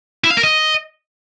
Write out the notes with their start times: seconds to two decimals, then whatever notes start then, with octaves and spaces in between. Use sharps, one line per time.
0.24 E4
0.31 F5
0.37 A#4
0.43 D#5